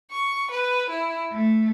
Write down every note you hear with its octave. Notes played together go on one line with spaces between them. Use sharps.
C#6
B4
E4
A3